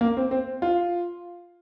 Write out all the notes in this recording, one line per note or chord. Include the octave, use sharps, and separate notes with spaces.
A#3
C4
C4
F4